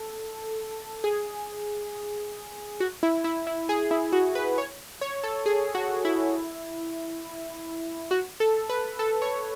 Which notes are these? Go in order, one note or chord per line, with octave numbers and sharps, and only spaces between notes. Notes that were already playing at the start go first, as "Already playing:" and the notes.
Already playing: A4
G#4
F#4
E4
E4
E4
G#4
E4
F#4
B4
C#5
C#5
A4
G#4
F#4
E4
F#4
A4
B4
A4
C#5